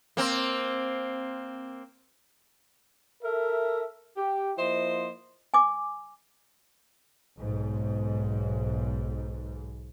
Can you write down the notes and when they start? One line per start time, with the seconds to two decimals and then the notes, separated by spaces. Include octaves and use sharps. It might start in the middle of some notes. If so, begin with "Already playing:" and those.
0.17 A#3 C4
3.23 A4 A#4 E5
4.17 G4
4.57 F3 A#3 E4 C5 D#5 C6
5.54 G#5 D6
7.38 B1 G#2